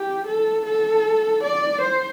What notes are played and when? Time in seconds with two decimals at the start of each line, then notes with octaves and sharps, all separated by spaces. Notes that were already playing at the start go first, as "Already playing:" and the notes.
Already playing: G4
0.27 A4
0.66 A4
1.44 D5
1.81 C5